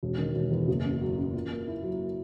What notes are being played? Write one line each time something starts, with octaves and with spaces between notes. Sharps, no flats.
E1
D#3
E1
E2
F#1
C#3
F#3
F#2
A#2
A#3
E4
F#3